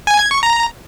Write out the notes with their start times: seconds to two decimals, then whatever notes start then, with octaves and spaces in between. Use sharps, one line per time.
0.07 G#5
0.19 G#6
0.31 C#6
0.43 A#5